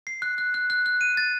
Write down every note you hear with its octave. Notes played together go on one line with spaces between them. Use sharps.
C7
F#6
F#6
F#6
F#6
F#6
D#7
A6